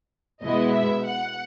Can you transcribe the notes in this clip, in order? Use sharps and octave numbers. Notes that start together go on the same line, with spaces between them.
B2 G#3 B3 E4 D#5
E5
F#5